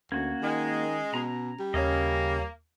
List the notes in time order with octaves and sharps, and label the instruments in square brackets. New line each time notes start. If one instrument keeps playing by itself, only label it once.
[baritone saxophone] D2 [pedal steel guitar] A#3 F#4 [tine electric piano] C#4 G#6
[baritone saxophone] D#3 [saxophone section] G#3
[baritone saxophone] B2 [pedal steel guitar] A#5
[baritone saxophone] G3
[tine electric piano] D#2 C#5 [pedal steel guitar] C#3 C#4 D#5 [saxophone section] A#3